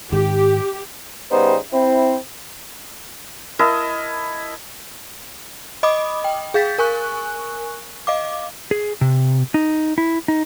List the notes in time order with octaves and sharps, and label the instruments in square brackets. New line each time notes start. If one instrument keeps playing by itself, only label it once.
[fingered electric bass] G#2 D#3 [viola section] G4
[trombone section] C#3 G3 B3 D#4 G4 C5
C4 E4
[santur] E4 A#4 D#5 A5
[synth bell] D#5 B5 D6 D#6
G5
G#4 F5 G6 A6 B6
A#4 G#5 C#6 F#6
D#5 F5 D6
[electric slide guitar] G#4
C3
D#4
E4
D#4